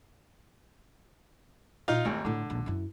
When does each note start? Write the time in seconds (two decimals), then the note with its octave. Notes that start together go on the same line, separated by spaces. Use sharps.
1.88 A#2 D#4 F4
2.05 G#1 D#2 A3 A#3
2.25 A2 D3 A3
2.50 A#1 D#2
2.66 F#2 E4